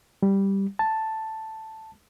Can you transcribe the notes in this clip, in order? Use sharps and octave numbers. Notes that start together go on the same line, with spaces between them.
G3
A5